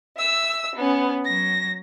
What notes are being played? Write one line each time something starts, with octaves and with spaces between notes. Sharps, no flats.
E5 E6
B3 C#4
F#3 A#6